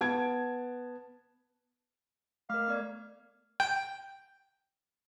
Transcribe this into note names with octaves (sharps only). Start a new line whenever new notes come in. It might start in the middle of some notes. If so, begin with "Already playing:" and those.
B3 A5 G#6 D7
A3 A#4 F5
B3 D5 G#6
G5